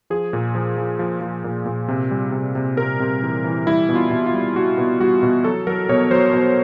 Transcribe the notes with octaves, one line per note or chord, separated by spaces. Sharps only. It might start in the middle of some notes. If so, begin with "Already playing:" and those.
F3 G#4
A#2
F3
F3
F3
F3
A#2
A#2
C3
G3
C3
C3
C3 A#4
C3
E3
E3
G3 E4
B2
F4
B2
F4
G3
G3 F#4
B2
G3 F#4
B2
F#3 A4
F#3 A#4
B2 C#5
F#3 C5
B2